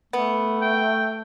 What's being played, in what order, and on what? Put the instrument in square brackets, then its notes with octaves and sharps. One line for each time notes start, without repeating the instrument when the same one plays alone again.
[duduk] A3 [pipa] B3
[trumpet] G5